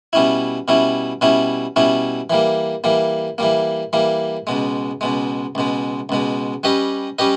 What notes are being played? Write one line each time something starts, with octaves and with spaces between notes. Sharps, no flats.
B2 G3 C#4 E4
B2 G3 C#4 E4
B2 G3 C#4 E4
B2 G3 C#4 E4
E3 G3 A#3
E3 G3 A#3
E3 G3 A#3
E3 G3 A#3
C#2 B2 G#3
C#2 B2 G#3
C#2 B2 G#3
C#2 B2 G#3
G3 C#4 G4 B4 D#5
G3 C#4 G4 B4 D#5